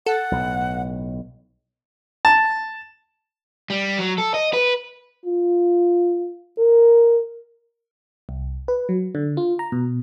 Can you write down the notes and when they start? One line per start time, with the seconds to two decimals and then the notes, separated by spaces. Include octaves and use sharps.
0.06 A4 F#5
0.31 B1 A2
2.25 A5
3.70 G3
3.98 F#3
4.18 A4
4.34 D#5
4.54 B4
5.25 F4
6.58 A#4
8.29 C2
8.68 B4
8.89 F#3
9.15 D3
9.37 F4
9.59 A#5
9.72 B2